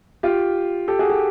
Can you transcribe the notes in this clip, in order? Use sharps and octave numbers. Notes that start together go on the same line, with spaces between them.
F4 G4
G4 A4
F#4 G#4
G4 A4